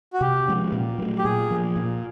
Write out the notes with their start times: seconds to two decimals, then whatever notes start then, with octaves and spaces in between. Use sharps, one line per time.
0.14 F#4
0.21 C3 G4
0.47 F3 G#3 C#4
0.72 A#2
0.98 F#3 A3
1.18 G4
1.24 A#2 G#4
1.51 F3 A#3
1.76 A#2